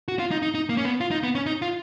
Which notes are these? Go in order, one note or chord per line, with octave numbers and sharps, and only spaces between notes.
F#4
F4
D#4
D#4
D#4
A#3
C#4
B3
F4
D#4
B3
C#4
D#4
F4